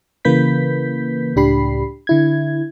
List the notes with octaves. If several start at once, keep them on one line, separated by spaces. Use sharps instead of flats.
C#3 E3 A#3 B4 G6 B6
C#2 A2 D4 G4 B5 C7
D3 E4 G#6